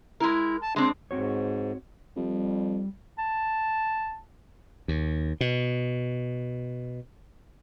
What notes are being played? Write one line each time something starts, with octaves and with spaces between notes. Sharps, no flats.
G#3 E4 A#4
A5
G#3 C4 D4
G#2 C4 F#4 C#5
F2 G3
A5
D#2
B2